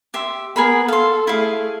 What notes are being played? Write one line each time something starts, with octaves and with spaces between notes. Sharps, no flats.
G4 E5 C6
B3 G#4 A#4 B5
A4 F5 C6
A3 E4 G#4 F5